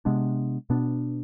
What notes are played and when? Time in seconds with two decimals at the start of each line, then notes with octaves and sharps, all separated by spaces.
0.05 C3 G#3 B3 D4
0.70 B2 B3 D4